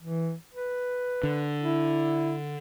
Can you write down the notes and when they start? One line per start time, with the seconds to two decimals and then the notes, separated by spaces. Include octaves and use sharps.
0.02 E3
0.53 B4
1.23 D3
1.63 E4